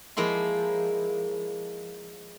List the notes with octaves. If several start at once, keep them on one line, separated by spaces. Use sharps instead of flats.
F3 G#3 A#3 E4 C6